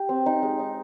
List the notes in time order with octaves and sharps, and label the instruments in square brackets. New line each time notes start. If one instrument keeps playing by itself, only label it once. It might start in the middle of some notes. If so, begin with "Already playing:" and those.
Already playing: [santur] G4
C4
D#4
G#3
D#4